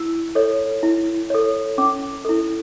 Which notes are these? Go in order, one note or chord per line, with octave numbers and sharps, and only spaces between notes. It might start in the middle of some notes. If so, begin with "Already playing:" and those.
Already playing: E4 E6
A4 C#5
E4
A4 C#5
C#4 D6
E4 A4